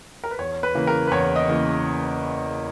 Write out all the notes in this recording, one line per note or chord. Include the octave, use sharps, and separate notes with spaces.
A#4
B4
E2 C#5
B4
C#3 E3 A#3
A#4
B4
E2 C#5
D#5
C#3 E3 A#3